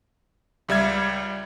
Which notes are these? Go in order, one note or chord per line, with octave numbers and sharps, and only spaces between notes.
C#2 G3 E5 G#6